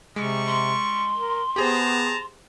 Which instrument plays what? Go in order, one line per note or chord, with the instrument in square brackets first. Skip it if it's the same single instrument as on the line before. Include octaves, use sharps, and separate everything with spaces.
[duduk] C3 [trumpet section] G3 C#6 [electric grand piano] G#3
[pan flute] C6
[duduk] A#4
[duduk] B3 [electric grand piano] G4 G#4 C5 [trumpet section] A5 A#5